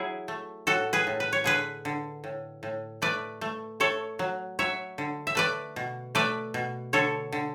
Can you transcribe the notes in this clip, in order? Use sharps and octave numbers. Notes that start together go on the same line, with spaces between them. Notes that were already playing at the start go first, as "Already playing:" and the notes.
Already playing: F#3 E4 G#4
A3
A2 F#4 A4
G#4 B4
A2
B4
C#5
D3 G#4 B4
D3
A2
A2
A3 B4 D5
A3
A3 A4 C#5
F#3
F#3 C#5 E5
D3
E5
A3 B4 D5
B2
A3 B4 D5
B2
D3 A4 C#5
D3